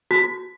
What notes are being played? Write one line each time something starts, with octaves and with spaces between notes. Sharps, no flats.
F#4